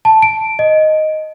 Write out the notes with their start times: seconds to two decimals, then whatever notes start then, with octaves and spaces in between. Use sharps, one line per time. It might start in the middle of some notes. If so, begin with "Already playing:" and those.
0.05 A5
0.22 D7
0.59 D#5